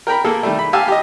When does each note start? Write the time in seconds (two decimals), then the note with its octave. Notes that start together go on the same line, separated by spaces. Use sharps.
0.07 A#4 G5 A#5 B5
0.24 A#3 G#4 A4
0.43 D#3 G3 A3
0.59 B5
0.73 G4 F5 G#5 A5 E6
0.88 G4 D#5